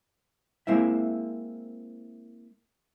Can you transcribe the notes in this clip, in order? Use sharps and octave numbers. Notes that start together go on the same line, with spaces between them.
G#3 A#3 C4 E4 E5